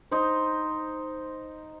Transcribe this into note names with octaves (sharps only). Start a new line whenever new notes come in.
D#4 C5